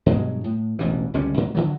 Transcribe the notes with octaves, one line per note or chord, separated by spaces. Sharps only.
G2 B2 F#3 G#3
A2
E1 A1 B2 E3
C#2 D3 G3 C#4
G#2 F#3
D3 E3 F#3